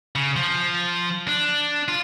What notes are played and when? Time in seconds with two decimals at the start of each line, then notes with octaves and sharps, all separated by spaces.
0.15 C#3
0.36 F3
1.28 D4
1.88 F4